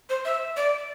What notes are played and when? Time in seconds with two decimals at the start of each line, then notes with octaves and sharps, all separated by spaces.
0.09 C5
0.25 E5
0.56 D5